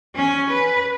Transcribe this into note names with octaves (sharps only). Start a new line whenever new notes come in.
C#4
B4